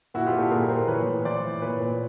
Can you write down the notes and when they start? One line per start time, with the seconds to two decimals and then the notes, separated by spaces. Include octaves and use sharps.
0.14 A#2 E4 F#4
0.26 F4 G4
0.32 A#2
0.39 G4 A4
0.51 A#2 G#4 A#4
0.69 A#2 A#4 C5
0.88 E3 B4 C#5
1.06 A2
1.25 E3 C5 D5
1.43 A2
1.62 A#2 B4 C#5
1.80 A#2